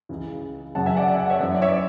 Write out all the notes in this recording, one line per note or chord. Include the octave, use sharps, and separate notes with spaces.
C#2 C#3 E3
F#2 C#3 F#3 F#5 A5
E5 G#5
D5 F#5
D5
E5
D5 F#5
C#5 E5
F#2 E3 E5
D5
C#5 E5
D5